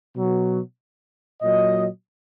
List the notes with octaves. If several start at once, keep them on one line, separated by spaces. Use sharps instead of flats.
B2 F#3
A#2 F#3 D#5